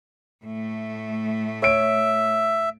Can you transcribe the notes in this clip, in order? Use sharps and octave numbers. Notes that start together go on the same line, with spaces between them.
A2 A3
C#5 E5 D7